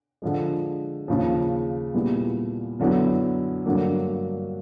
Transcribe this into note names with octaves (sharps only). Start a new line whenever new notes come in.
D3 F3 G#3
D#2 C#3 F3
A#2 G3 B3 E4
F#2 D3 F#3 B3 E4
G2 D3 F#3 A#3 D4